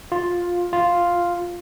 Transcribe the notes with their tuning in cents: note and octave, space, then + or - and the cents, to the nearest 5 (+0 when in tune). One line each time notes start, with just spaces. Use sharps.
F4 +10
F4 +0